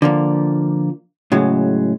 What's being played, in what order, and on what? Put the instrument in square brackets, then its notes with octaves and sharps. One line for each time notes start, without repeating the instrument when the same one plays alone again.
[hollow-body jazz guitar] D3 F3 A#3
A2 C#3 F#3 G#3